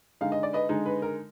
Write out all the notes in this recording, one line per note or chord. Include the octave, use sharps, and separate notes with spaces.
D3 G#3 D#4 F5
D#5
D5
B4 D#5
D3 G#3 D#4
B4
A#4